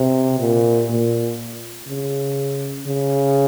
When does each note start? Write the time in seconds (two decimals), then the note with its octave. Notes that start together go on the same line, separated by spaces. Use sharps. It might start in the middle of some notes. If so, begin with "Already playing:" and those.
Already playing: C3
0.39 A#2
0.90 A#2
1.88 C#3
2.87 C#3